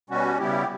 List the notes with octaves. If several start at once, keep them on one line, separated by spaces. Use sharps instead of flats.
B2 G3 C#4 F#4
C#3 G3 B3 E4 G4